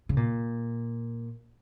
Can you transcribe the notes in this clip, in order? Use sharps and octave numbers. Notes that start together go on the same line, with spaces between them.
C#3
A#2